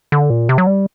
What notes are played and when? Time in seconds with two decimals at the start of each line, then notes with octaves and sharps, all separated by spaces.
0.12 D3
0.30 A#2
0.49 C3
0.58 F#3
0.67 G3